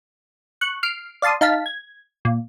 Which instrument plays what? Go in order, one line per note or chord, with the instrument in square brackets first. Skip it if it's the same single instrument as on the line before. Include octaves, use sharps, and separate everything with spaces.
[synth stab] C#6 F#6
F6 C7 D7
D5 F5 A5 C6 D#6
D#4 F5 A5 B6
G#6
A#2